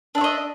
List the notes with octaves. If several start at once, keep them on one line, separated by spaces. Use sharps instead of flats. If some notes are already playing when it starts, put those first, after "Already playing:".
D4 C#5 D#5 E5